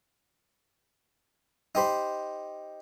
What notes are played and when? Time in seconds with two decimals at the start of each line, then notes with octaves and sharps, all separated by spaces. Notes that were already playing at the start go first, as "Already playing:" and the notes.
1.75 D#4 G4 C5 B5